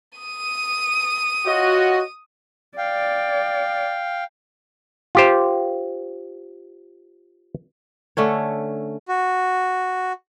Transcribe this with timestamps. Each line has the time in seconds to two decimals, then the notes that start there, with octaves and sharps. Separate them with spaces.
0.19 D#6 D#7
1.46 F4 F#4 C#5 D#5
2.78 D5 F5 G5
5.15 F4 G4 C5
8.17 D3 A3 C#4 C#5
9.08 F#4